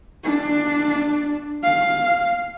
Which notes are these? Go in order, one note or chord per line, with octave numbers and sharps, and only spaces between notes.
D4
F5